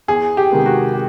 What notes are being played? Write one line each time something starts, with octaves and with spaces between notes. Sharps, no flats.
E2 G#4
G4
C3 D#3 G#3 B3
F#4
G4